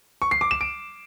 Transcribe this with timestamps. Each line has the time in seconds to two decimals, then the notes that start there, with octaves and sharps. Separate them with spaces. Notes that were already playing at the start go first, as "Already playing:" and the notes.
0.22 C#6
0.31 C7
0.41 D6
0.51 E7
0.61 D7